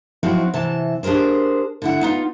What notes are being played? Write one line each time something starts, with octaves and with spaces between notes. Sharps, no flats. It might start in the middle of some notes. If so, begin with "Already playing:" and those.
F3 F#3 C4 D#4 E4 F#4
C3 E3 A5
D4 G4 G#4 A#4 C5
D3 E4 F#5
B3 D#4 F4